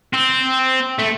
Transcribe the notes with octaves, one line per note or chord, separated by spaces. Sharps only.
C4
A3